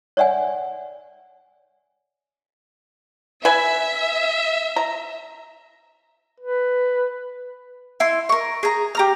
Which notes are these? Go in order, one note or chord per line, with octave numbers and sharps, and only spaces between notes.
C#5 D5 E5 F#5 G#5
B4 E5 G#5
A#5
B4
E4 C6
A#4 C#6
G#4 A#5
G4 A#5 F6